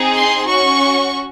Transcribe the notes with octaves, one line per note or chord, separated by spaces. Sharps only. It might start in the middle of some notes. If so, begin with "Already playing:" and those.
Already playing: C4 D#4 G#4
C6
C#4 F#4 C#6